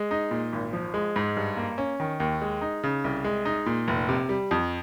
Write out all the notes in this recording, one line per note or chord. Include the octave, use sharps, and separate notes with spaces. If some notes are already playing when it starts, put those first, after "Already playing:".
Already playing: G#3
D#4
A#2
G#1
F3
G#3
G#2
G2
A#3
C#4
D#3
D#2
G#3
D#4
C#3
C2
G#3
D#4
A#2
F1
C3
G3
F2